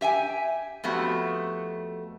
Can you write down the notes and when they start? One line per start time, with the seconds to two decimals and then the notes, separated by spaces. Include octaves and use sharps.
0.01 G4 E5 G5 G#5
0.84 F2 A3 B3 F#4 G4